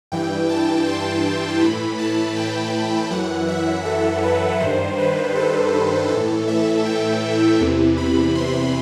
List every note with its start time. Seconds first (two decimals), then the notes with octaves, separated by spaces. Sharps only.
0.12 G2 E3 G5
0.49 A5
0.86 C6
1.61 A2 E3 B5
1.98 A5
2.36 G5
3.11 F#2 E3 F#5
3.48 E5
3.85 A4
4.23 B4
4.60 G2 D#3 C5
4.98 B4
5.35 A4
6.10 A2 E3 A4
6.48 E5
6.85 G5
7.60 E2 C3 E3
7.97 B5
8.35 C6